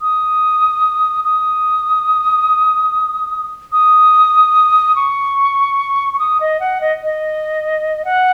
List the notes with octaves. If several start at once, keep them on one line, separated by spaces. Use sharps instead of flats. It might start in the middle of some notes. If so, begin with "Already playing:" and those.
D#6
D#6
D#6
C#6
C#6
D#6
D#5
F#5
D#5
D#5
F#5